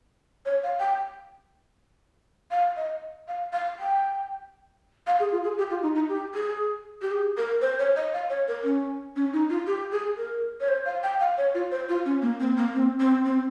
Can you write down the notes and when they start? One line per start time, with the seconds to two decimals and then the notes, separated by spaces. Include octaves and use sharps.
0.45 C#5
0.63 F5
0.79 G5
2.51 F5
2.76 D#5
3.28 F5
3.53 F5
3.79 G5
5.07 F5
5.20 G#4
5.32 F4
5.44 G#4
5.58 G4
5.70 F4
5.82 D#4
5.95 D#4
6.09 G4
6.34 G#4
7.02 G4
7.11 G#4
7.37 A#4
7.61 C5
7.79 C#5
7.96 D#5
8.14 F5
8.30 C#5
8.48 A#4
8.64 C#4
9.16 C#4
9.33 D#4
9.50 F4
9.67 G4
9.92 G#4
10.17 A#4
10.60 C#5
10.69 C5
10.86 F5
11.03 G5
11.20 F5
11.38 C#5
11.54 F4
11.71 C5
11.89 F4
12.05 C#4
12.22 A#3
12.40 C4
12.57 A#3
12.74 C4
13.00 C4
13.25 C4